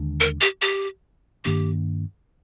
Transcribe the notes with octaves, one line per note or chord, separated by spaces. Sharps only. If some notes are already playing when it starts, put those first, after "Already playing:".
Already playing: D#2 D3 G#3 D4
A#4
G4
G4
G2 D#3 A#3 D4 G4